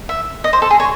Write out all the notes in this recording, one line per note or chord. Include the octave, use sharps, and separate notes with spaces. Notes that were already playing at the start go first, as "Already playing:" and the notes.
E5
D#5
C5
A4
G#4
C#5